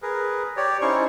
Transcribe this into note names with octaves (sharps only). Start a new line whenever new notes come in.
G#4 A#4 B4
G4 C#5 D5
C#4 D#4 E4 C5 C#6